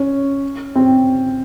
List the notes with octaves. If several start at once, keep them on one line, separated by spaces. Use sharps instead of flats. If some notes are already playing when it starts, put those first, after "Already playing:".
Already playing: C#4
C4